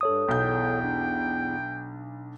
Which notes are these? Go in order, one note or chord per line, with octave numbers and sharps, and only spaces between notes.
G2 A4 C#5 D#6
B1 E2 G5 G6
D4